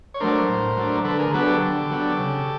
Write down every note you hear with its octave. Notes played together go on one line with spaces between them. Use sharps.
C#5
F#3 A3 D4 A#4 C5
A2
F#3 A3 D4
D3 A4 B4
G#4 A#4
F#3 B3 D4 A4 B4
G4 A4
D3
F#3 B3 D4
C#3